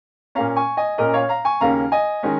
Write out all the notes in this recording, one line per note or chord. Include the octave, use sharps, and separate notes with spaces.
A#2 A#3 C#4 F5 A#5
G#5 C#6
D#5 G#5
A#2 A#3 C#4 A#4 D#5
C#5 F5
F5 A#5
G#5 C#6
D#2 C#3 A#3 C#4 F5 A#5
D#5 G#5
D#3 G#3 C#4